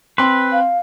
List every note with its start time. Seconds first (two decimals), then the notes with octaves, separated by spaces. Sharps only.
0.18 C4 B4 C6
0.52 F5